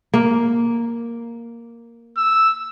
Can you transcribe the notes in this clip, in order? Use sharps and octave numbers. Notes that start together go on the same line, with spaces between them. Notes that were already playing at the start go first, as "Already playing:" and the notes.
A#3
E6